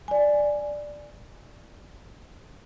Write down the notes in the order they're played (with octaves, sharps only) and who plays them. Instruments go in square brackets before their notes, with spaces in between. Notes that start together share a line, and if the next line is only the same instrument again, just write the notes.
[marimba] D5 G#5